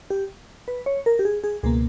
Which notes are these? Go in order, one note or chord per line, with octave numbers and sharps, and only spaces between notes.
G4
B4
C#5
A#4
G4
G#4
G#4
C#2 B2 A#3 G#4